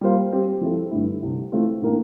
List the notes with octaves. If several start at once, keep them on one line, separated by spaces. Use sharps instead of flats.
G3 A#3 F4 C5 F5
G3 C4 G4
F3 C4 E4 A4
G2 D3 A3 E4
C2 C3 E3
E3 A3 C4 F4
A2 E3 A#3 D4